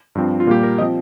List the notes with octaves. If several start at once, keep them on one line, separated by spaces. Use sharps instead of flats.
G2 F3 C4
F4
A#2 G3 A#3 G4
A#4
F3 C4 D#5